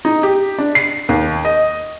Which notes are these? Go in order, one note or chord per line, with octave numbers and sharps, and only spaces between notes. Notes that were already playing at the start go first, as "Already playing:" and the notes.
D#4
G4
D4
C7
D#2
D#5